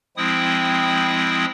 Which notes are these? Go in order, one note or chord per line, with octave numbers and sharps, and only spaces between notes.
F3 G#3 C4 E4 G5 D#6